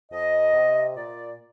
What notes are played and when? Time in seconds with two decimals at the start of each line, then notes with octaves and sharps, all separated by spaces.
0.11 F2 D#5
0.54 C3
0.95 A#2 D5